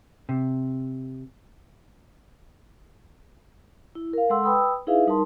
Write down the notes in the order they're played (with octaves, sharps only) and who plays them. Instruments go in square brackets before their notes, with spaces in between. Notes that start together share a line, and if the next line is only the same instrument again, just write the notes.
[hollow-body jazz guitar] C3
[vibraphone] E4
A#4 F5
G#3 A4 F#5 C6 E6
B4 G5 B5 D#6 E6
D#4 E4 G#4 B4 E5 F5
G3 D#4 A#4 A5 C6